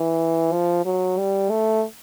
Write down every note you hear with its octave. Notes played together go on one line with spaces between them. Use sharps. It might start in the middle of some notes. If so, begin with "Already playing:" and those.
Already playing: E3
F3
F#3
G3
A3